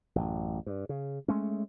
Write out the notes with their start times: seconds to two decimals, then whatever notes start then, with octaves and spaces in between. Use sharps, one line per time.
0.16 A1 F#2
0.66 G2
0.89 C#3
1.28 G#3 A3 C#4